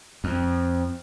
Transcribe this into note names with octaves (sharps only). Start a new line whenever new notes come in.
F2 C4